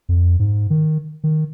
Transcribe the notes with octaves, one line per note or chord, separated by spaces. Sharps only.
F2
G#2
D#3
D#3